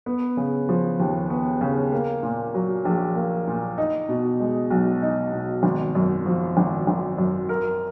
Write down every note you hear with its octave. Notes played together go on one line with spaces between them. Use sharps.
B3
C#3
F3
D#2
B3
C#3
A#3
A#2
F#3
A#1
A#3
A#2
D#4
B2
G#3
B1
D#4
B2
G#1
F#2
F3
G#1
G#1
F#2
A#4